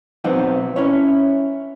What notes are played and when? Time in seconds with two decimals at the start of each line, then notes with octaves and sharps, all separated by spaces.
0.24 B1 F#3 B3 C4 D#4 F#5
0.76 C#4 E4 C#5